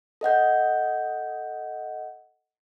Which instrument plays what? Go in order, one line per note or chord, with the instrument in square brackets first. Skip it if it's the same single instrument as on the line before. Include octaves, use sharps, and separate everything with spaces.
[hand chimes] A4 D#5 F#5 G6